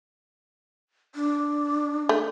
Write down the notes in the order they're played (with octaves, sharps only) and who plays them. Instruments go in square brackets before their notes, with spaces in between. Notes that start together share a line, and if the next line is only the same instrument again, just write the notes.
[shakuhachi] D4
[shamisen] A3